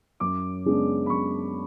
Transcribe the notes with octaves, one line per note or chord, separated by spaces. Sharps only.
F#2 D6
C#3 G#3 B3 D4
B5
F#2 C#6